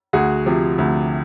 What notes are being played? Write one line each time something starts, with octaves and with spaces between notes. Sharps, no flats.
D2 F#4 G#4
C3 F3
D2